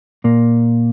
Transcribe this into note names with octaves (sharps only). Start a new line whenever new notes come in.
A#2 A#3